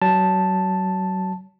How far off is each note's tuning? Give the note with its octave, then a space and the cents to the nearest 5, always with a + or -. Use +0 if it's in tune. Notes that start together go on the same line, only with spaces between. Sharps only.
F#3 +30 A5 +0